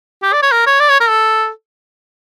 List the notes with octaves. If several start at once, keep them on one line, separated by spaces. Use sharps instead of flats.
G4
D5
C#5
A#4
C#5
D5
C#5
A#4
A4